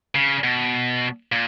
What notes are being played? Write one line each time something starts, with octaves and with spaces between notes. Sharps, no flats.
C#3
B2
A#2